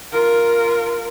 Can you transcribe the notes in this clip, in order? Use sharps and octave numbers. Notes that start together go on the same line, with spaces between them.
F4 A#4